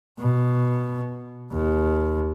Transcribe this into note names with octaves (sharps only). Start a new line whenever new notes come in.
B2
D#2